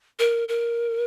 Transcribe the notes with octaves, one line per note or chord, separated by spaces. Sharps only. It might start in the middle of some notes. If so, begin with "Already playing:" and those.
A#4
A#4